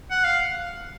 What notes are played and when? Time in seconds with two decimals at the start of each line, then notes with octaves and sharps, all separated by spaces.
0.11 F#5
0.24 F5